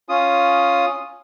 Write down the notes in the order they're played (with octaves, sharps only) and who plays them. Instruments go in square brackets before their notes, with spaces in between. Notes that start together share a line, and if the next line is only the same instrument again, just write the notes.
[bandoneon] C#4 F4 D#6